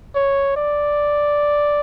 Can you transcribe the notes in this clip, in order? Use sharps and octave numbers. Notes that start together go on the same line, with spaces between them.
C#5
D5